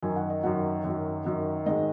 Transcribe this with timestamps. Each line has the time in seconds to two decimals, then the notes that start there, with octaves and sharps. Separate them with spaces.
0.02 F#2 D#3 F#3 G#5
0.16 F#5
0.30 D#5
0.43 F#2 D#3 F#3 F#5
0.85 F#2 D#3 F#3
1.25 F#2 D#3 F#3
1.66 G#2 D#3 G#3 D#5